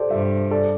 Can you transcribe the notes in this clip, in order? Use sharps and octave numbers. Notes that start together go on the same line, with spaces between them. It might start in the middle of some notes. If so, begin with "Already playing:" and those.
Already playing: G4 A4 C5 D5
G2 C5 E5
A4 D5